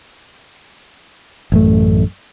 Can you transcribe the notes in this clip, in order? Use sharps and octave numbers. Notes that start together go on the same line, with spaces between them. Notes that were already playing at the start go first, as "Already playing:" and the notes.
A1 F#2 A3